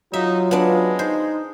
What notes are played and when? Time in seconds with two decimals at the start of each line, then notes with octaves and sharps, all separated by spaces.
0.13 F#3 D#4 F4 E5
0.51 G#3 B3 D4
0.99 D#4 C5